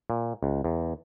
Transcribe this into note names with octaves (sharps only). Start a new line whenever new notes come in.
A#2
C#2
E2